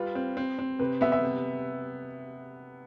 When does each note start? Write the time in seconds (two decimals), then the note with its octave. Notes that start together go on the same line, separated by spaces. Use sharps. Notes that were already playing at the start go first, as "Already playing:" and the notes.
Already playing: G3 F4 B4
0.15 C4
0.37 C4
0.59 C4
0.79 C3 B4
1.01 B3 E5
1.12 E5
1.24 C3